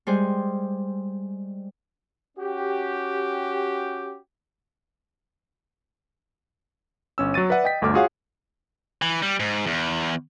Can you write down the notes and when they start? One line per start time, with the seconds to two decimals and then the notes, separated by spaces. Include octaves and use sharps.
0.07 G3 G#3 G#4 C5
2.38 C#4 F#4 G4
7.18 G1 C#4 E6
7.34 F#3 C#6 A6 D#7
7.50 B4 D5 E5 F#5
7.64 D#5 G5 B6
7.82 G1 D2 A3 D6 F6
7.94 F4 F#4 G#4 C#5 F5 F#5
9.02 E3
9.23 G3
9.40 G#2
9.67 E2